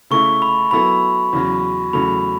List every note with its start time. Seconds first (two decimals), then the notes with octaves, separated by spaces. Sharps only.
0.11 C#3 A3 E4 C#6
0.42 B5
0.71 F#3 B3 E4 A4 B5
1.33 E2 C#3 F#3
1.93 E2 C#3 F#3 A3 B5